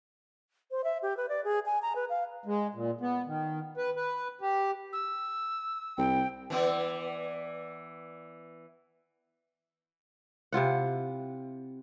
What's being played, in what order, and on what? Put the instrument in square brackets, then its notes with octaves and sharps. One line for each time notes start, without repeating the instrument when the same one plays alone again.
[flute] C5
E5
G4
B4
D5
G#4
G#5
A#5
B4
F5
[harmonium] G#3
A#2
B3
D#3
B4
B4
G4
[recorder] E6
[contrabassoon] C2 [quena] G5
[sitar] E3 B3 D5
[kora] C3 E4 F4 F#5